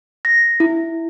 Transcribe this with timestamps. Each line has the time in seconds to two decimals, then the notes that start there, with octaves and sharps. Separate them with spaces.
0.25 A#6
0.60 E4